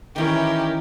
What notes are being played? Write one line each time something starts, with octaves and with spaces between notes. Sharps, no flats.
D#3 E3 C#4 G4 A#4